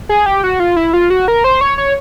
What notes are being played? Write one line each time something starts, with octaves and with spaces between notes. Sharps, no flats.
G#4
G4
F#4
F4
E4
F4
F#4
A#4
C5
C#5
C#5